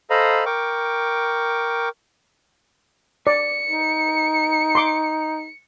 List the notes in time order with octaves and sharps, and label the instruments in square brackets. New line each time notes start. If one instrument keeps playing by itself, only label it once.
[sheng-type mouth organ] A4 C5 D#5 F5 A#5 B5
A#4 G5 C#6 D6
[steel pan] D5 [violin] C#7
[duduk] D#4
[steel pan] C6 D6